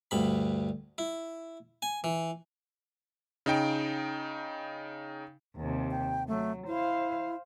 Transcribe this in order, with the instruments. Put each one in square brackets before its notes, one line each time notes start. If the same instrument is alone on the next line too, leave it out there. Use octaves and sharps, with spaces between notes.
[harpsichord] D2 G2 B5
E4
G#5
E3
[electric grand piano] C#3 D#4 G5 D7
[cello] D#2 C3
[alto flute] G5
[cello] F#3 [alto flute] A3
[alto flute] E4 [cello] C5 F5